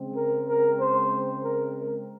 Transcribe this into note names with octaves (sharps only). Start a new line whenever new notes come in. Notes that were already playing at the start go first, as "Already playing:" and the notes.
Already playing: C#3 G#3 C4
A#4
A#4
C5
A#4
A#4